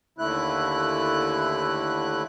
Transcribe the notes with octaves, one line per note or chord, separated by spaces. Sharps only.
D#2 D3 A3 E4 F#6